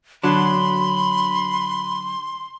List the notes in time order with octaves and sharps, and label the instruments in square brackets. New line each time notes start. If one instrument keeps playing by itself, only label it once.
[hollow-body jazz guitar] D3 F#3 D4 [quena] B5 [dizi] C6